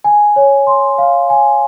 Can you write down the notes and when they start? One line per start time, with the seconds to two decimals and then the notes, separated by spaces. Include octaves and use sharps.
0.04 G#5
0.36 C#5
0.67 C6
0.98 F5
1.30 G#5